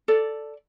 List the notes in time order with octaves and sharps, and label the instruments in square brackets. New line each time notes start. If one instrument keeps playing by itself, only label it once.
[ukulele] A4 D5